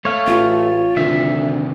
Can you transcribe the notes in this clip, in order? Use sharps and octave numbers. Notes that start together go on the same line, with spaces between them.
A3 C#5 F5
A1 F4
D2 C3 D#3 E5